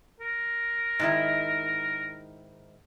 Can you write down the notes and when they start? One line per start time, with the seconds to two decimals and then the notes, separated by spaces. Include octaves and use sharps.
0.20 A#4
0.99 G#2 D#3 E4